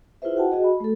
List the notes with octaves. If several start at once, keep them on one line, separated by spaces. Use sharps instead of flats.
E4 F4 G#4 B4 C5 E5
F#4 F#5 G5 A5
F#4 G#4 D#5
B5
A3 A4